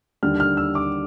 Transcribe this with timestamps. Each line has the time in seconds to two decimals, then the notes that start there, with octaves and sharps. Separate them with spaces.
0.23 D#2 D3 G3 F6
0.40 F6
0.57 E6
0.75 D6